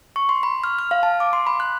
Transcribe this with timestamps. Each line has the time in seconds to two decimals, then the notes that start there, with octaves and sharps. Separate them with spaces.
0.16 C#6
0.29 C6
0.43 B5
0.64 F6
0.79 F6
0.91 F5
1.03 A5
1.20 D6
1.33 C6
1.47 B5
1.60 F#6